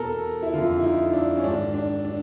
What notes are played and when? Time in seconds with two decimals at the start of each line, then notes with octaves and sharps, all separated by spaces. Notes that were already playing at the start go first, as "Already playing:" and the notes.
Already playing: E2 B2 A4 A#4
0.42 E4
0.53 F2 D3 F4
0.79 E4
0.84 D#4
1.13 D4
1.37 C#4
1.44 G#2 D#3 D4
1.74 D4
2.05 D4